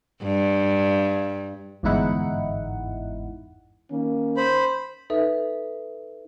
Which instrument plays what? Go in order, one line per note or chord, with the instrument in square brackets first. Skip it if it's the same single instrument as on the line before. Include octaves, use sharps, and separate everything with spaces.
[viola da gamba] G2
[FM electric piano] G1 E2 G#2 D#4 E4 F#5
[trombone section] D#3 A#3 C#4
[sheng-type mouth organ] C5 B5
[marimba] D#4 A4 B4 E5